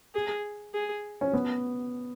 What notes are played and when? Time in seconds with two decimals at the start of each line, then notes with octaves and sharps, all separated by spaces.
0.15 G#4
0.74 G#4
1.21 C#4
1.33 B3